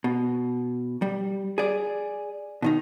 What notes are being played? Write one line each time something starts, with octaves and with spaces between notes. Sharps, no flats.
B2
G3
G#4 D5
B2 D#3 D#4